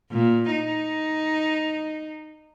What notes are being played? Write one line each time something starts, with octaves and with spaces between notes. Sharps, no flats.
A#2
D#4